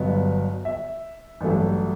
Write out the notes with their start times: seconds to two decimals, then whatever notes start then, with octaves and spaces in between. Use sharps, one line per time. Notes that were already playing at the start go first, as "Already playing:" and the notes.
Already playing: G1 G2 F#3 B3 D#5
0.65 E5
1.41 A1 G2 F#3 A3